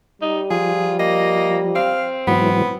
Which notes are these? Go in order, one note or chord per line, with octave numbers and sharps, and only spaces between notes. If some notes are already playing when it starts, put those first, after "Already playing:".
G3 D#4
F3 F4 G#4
A#3 D#5
C4 F5
G#2 E3 F#3 B3